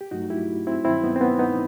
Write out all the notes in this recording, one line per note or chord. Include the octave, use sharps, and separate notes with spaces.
G4
G2 F#3 A3 D#4 F#4
E4 G4
C4 E4
G2 D#3 F#3 C4 E4
B3 D#4
C4
B3
B3 D#4